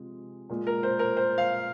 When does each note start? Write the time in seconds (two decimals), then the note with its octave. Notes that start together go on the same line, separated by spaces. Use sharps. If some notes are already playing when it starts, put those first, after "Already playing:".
Already playing: C3 F3 G#3
0.49 A#2 G#3
0.67 A#4
0.83 C5
0.99 A#4
1.17 C5
1.38 F5